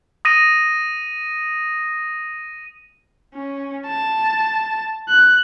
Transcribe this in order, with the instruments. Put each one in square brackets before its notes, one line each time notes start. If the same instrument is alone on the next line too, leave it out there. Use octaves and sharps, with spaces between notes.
[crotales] D#6 A#6 D#7
[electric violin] C#4
A5
F#6